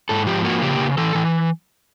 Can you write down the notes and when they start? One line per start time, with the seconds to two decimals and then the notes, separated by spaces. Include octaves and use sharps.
0.09 G#2 A4
0.27 F3 G4
0.45 A#3 F#4
0.62 C#3 G4
0.79 C#3
0.97 E3 A4
1.15 E3